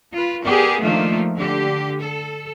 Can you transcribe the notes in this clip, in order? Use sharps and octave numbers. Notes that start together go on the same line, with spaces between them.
F4 B4
B3 G4 G#4 A#4 D5
D#3 F3 A3 A#3 D4 F4
D3 G4
A4